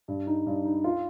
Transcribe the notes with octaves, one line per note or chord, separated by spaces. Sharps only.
G2
D#4
G2
D#4
F4